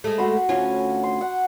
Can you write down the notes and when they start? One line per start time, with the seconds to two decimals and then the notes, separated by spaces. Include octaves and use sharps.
0.04 G#3 A3
0.18 F#4 B5 C6
0.49 D2 C#4 F4
1.03 C6
1.21 F#5